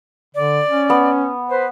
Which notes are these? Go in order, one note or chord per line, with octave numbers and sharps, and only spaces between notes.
D3 D5
C#4
B3
B4 C5